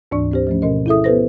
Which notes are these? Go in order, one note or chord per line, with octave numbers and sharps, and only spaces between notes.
D2 G#2 E3 D4 D5 C#6
C4 G4 C5
F3 A3 C#4
B2 C#4 A#4 D#5
E4 G#4 A4 E5 D#6
B3 G4 A4 B4 C5 A#6